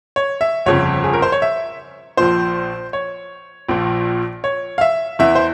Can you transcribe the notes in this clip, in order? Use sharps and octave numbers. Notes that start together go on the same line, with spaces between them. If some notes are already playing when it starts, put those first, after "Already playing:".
C#5
E5
G1 F2 C#3 C#5
G#4
A#4
C5
C#5
E5
A#1 A#2 F3 C5
C#5
A#1 A#2 F3
C#5
F5
E5
E2 E3 E5
C5